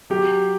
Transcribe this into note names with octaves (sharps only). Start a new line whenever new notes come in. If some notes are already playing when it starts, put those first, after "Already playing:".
F#3 G4